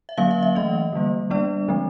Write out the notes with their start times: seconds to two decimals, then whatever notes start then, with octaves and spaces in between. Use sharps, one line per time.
0.09 E5
0.17 D3 F#3 A#3 C#4 F5
0.31 E5
0.43 E5
0.55 E3 A3 C#4 D#5
0.93 D3 G3 A#3
1.30 G3 B3 D4 D5
1.68 D3 F3 G#3 C4